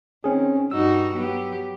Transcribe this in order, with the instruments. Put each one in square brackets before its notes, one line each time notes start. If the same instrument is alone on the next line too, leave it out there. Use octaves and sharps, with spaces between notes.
[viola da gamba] D#3 [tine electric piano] C4 C#4 G#4
[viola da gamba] G2 D#4 F#4 [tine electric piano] E6
[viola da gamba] F#3 B3 G4